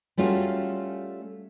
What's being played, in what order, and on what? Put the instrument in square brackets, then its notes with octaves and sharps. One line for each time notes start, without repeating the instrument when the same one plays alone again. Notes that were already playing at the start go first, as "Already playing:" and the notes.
[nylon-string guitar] G3 A3 C#4 F4 F#4 G#4